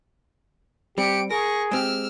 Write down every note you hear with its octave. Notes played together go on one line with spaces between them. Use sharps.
G3 C4 G4 C#7 D7
G#4 A#4 C#6 A#6
G#3 C4 G4 E6 F6